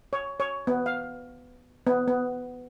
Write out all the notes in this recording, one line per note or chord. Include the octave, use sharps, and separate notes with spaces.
C#5
C#5
B3
F5
B3
B3